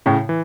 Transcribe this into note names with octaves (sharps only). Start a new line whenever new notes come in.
A2 C#3
E3